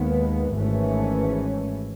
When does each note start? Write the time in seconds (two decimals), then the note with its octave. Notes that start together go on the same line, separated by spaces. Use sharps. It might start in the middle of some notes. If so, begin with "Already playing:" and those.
Already playing: D#2 D#3 G#3 B3
0.55 G#1 G#2 E3 A3 C#4